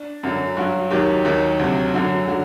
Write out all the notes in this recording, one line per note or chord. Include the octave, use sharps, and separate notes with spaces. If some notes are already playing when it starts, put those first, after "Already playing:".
Already playing: D4
F#2 D3 F#3
G2 F#3 F#4
D#2 D#3 F#3 G4
D#2 D#3 F#3
D2 C3 F#3
F#2 D3 F#3 F#4
D3 F#3 F#4